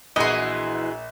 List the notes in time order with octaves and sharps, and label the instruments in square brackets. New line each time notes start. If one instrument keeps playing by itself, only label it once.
[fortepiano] A#1 [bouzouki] E3 [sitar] B3 F#4 G#4 [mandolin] D#5 C6